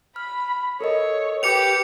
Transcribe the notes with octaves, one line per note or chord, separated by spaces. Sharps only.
B5 F6
A4 A#4 C#5 D#5
G4 B4 D6 C#7 F7